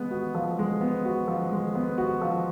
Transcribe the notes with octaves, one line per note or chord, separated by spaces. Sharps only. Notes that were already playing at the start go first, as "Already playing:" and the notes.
Already playing: G#3 B3
F#4
F3
G#3
B3
F#4
F3
G#3
B3
F#4
F3